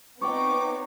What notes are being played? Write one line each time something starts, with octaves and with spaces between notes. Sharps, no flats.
B3 C4 D#4 B4 C#5 D5 G5 D6